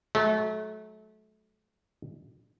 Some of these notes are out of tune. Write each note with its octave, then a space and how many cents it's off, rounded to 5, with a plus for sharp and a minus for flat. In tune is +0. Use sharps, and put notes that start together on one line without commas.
F#3 +0 A3 -30